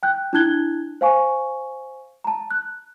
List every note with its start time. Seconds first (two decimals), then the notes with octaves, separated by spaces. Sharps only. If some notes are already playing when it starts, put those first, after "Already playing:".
0.03 G5 F#6 G6
0.33 D4 E4 A5 F#6 G#6 G7
1.01 C5 F5 G#5 C#6
2.24 A5 A#5
2.51 F#6